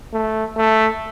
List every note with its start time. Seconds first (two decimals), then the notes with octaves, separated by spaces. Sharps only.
0.14 A3
0.57 A3